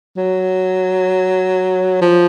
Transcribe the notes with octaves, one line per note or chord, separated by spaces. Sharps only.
F#3
F3